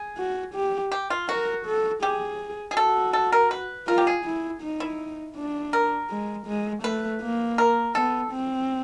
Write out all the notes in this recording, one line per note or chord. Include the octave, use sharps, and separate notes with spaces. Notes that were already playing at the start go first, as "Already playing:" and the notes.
Already playing: G#4
F#4
G4
G4
F4
F#4 A#4
A4
G4 G#4
G#4
F#4 A4
A4
A#4
B4
F4 A#4
G4
G#4
E4
D#4
E4
D4
A#4
G#3
G#3
A3 B4
A#3
A#4
B3 A4
C4